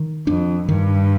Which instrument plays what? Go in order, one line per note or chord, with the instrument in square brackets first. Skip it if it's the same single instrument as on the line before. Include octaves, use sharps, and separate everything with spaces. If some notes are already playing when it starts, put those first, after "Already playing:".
Already playing: [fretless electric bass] D#3
[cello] F2 [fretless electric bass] D4
[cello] G2 [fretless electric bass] D#3